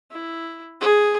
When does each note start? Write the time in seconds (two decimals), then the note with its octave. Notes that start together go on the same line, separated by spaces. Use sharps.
0.11 E4
0.81 G#4